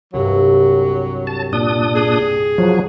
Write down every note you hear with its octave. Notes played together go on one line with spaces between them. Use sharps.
C2 G2 F#3
A5
A#2 D4 D#6
G#4
F3 F#3 F#4